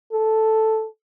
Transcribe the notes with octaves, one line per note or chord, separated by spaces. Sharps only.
A4